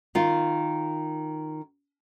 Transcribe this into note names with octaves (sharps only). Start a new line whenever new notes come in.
D#3 F4